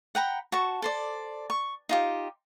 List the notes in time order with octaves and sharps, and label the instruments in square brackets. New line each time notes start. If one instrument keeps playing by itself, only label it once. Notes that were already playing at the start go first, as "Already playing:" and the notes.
[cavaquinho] F#5 G5 A#5 B5
F#4 A5 C#6
A4 C5 D5
C#6
D#4 F4 G4